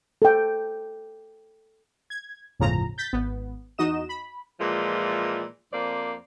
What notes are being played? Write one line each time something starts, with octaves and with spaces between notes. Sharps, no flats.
A4 G5
G#6
G1 E2 A2 C#3 F3 A#5
G6 A6 B6
G#1 B3
E2 D#4 F#4 D#5 E7
B5
A#2 E3 F3 G#3
F2 A#3 C5 D5